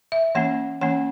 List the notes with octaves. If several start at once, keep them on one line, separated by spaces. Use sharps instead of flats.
E5
E3 A#3 C#4 F#5
E3 A#3 C#4 F#5